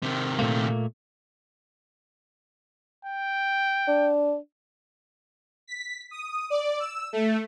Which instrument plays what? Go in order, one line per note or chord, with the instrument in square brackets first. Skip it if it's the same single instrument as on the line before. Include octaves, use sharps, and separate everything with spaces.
[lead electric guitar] C3 D#3
[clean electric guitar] A#2 A3 A#3
[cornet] G5
[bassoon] D4
[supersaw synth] B6
D#6
D5
E6
A3